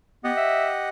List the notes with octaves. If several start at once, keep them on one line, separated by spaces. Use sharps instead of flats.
B3 G4 D#5 F#5
E5